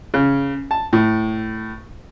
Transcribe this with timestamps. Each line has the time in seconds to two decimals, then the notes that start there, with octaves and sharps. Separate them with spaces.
0.14 C#3
0.71 A5
0.93 A2